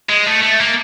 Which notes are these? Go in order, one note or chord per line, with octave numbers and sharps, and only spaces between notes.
G#3
A3
A3
A#3